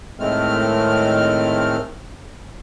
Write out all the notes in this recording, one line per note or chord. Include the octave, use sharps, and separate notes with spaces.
A2 D#3 G#3 A3 C4 F6